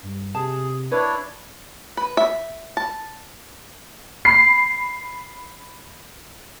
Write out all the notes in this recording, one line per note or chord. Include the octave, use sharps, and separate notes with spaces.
G2
C3 G#4 A5
D4 E4 B4 C#5 D5
B4
E5
A5
B5 C7